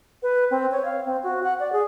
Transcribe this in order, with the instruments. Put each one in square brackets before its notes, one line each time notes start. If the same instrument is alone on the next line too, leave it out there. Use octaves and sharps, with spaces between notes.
[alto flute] B4
C4
C#5
F5
C4
F#4
F#5
D5
G#4